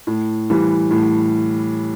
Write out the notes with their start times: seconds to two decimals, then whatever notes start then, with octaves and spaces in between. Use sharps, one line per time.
0.07 A2
0.50 E3 G3
0.91 A2